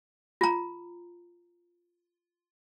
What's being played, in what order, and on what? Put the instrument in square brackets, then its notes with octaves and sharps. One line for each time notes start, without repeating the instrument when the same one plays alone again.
[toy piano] F4 A#5